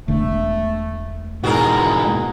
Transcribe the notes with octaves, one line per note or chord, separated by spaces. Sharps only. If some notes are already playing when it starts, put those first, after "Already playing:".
E1 D3 A3
G#2 B2 D#4 E4 F#4 G#4 A#4